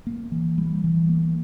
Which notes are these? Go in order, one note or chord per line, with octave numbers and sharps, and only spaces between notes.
A#3
E3
G3
E3
A#3